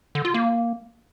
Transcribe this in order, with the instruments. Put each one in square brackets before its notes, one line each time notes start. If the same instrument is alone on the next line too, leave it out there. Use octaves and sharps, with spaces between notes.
[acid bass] D3
F4
A#3